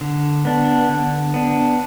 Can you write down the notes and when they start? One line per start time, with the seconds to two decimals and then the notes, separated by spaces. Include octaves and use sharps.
0.01 D3
0.45 B3 D4
0.89 D3
1.34 B3 D4